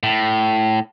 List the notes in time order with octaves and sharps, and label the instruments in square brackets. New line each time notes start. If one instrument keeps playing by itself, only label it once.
[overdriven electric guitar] A2